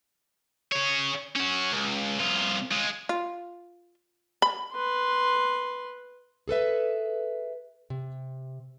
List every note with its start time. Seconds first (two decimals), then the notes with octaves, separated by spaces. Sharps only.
0.72 G#4 C#5
1.36 C#4 F#4
1.72 C#2
2.20 C2 F4
2.72 G#3 F4
3.09 F4
4.42 B5
4.73 B4 C6
6.48 G#4 A4 B4 E5
7.90 C3